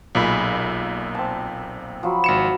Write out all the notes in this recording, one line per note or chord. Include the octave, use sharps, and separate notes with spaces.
B1 A#2 G#3 E5 B5
C4 A5
F3 F#3 B5
G#1 C#7 E7